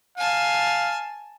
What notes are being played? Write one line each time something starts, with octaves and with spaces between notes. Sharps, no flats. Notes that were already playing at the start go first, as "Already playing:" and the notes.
F5 G#5 A5